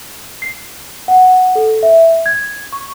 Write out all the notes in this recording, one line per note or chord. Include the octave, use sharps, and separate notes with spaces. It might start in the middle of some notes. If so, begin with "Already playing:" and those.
C7
F#5
A4
E5
G#6
C#6